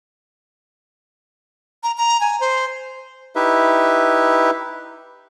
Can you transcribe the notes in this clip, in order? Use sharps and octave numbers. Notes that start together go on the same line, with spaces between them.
A#5
A#5
G#5
C5
D#4 E4 G4 B4 E5